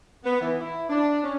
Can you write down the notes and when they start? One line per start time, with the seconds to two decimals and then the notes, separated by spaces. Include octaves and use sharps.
0.24 B3
0.40 E3
0.59 E4
0.89 D4
1.23 C#4